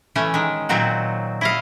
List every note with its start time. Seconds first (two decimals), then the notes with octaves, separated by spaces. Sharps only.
0.16 E3 A3 C#4
0.34 D#3 G#3
0.69 A#2 D#3 F#3 C4 F#4
1.41 E4 D#5 F5